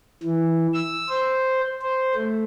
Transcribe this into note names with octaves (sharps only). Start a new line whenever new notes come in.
E3
E6
C5
C5
A3